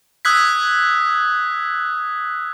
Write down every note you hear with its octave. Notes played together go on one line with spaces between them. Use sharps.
D#6 E6 F#6 G#6 B6